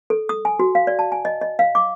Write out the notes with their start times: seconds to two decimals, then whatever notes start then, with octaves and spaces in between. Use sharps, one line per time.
0.10 A4
0.29 D#6
0.45 G#5
0.59 F#4
0.75 F5
0.87 D5
0.99 A5
1.12 G#5
1.25 D#5
1.41 D#5
1.59 F5
1.75 D6